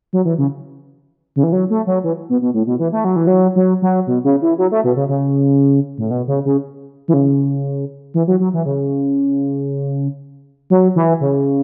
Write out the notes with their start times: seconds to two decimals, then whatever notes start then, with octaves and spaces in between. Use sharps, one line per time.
0.13 F#3
0.25 E3
0.38 C#3
1.36 C#3
1.43 E3
1.52 F#3
1.70 A3
1.87 F#3
2.04 E3
2.29 B2
2.42 B2
2.54 A2
2.67 B2
2.79 E3
2.92 A3
3.04 F#3
3.16 E3
3.27 F#3
3.56 F#3
3.82 F#3
4.07 B2
4.24 C#3
4.42 E3
4.58 F#3
4.72 A3
4.84 B2
4.96 C#3
5.09 C#3
5.98 A2
6.10 B2
6.27 C#3
6.45 C#3
7.08 E3
7.14 C#3
8.14 E3
8.27 F#3
8.40 F#3
8.54 E3
8.65 C#3
10.70 F#3
10.96 E3
11.20 C#3